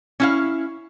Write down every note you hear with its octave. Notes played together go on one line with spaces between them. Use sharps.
C#4 E4 F5